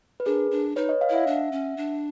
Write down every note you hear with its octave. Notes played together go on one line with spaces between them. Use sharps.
B4
D4 G#4 A#4
D4
D#4 B4 C#5
C#5 D#5
D#5 F5
E4 E5 F#5
D4
C#4
D4